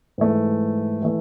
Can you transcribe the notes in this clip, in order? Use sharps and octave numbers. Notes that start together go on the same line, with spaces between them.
G#2 E3 A3
E3 A3